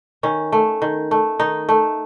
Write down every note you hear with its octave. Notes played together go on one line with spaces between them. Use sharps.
D#3 C#4
A3
D#3
A3
D#3 D#4
A3